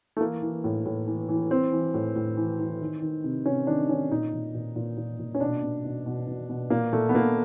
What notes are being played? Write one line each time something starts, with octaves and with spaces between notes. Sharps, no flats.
A3
E3 A#3
E3
A2
A2
E3
E3
E3 C4
E3
A2
A2
E3
E3
D#3
D#3
C3
C3 C#4
D#3 D4
D#3 C#4
A#2 D#4
A#2
A#2
A#2
A#2
A#2
C#4
B2 D4
B2
B2
B2
B2
B2
A#2 A#3
A#2 A3
B3
A#2 A#3